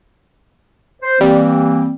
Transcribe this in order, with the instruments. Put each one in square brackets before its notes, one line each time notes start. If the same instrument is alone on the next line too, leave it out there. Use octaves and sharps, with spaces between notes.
[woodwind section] C5
[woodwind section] E3 A#3 C4 [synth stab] G3